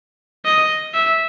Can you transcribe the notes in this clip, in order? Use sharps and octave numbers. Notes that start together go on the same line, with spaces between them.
D#5
E5